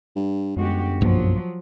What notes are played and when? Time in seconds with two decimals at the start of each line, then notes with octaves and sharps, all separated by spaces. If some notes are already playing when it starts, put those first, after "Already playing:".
0.16 G2
0.57 G1 F#2 G#3 F#4 G4
1.01 B1 G2 F3 F#3 A#3